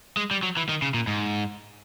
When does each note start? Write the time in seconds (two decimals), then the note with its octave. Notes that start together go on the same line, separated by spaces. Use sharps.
0.17 G#3
0.31 G3
0.43 F#3
0.57 E3
0.69 D#3
0.82 C#3
0.94 A#2
1.07 G#2